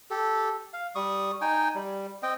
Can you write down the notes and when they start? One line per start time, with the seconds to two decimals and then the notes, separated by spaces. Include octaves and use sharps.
0.11 G4 A4
0.73 F5
0.95 G3 C#6 D#6
1.41 D#4 G5 G#5
1.75 G3
2.23 C4 D#5 G5